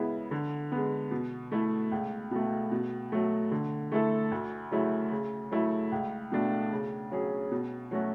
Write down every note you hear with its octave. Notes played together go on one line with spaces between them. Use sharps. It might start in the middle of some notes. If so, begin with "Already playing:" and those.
Already playing: C#3 G#3 B3 E4
D3
G#3 B3
B2
A3 E4
C#2
B2 A3
B2
F#3 A3
D3
A3 E4 A4
D2
C#3 F#3 A3 E4
C#3
F#3 A3 E4
C#2
B2 A3 D4
C#3
F#3 C#4 G#4
B2
F#3 A3 C#4 F#4